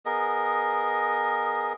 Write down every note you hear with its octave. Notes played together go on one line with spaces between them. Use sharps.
B3 G#4 A#4 D#5